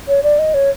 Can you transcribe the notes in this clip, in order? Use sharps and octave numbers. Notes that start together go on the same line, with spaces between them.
C#5
D5
D#5
C#5